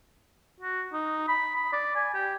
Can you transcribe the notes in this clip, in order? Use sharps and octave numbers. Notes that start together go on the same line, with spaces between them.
F#4
D#4
B5
B5
D5
G#5
G4